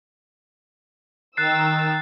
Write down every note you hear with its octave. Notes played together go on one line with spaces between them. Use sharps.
D#3 G5 A#5 E6 F#6 A6 C7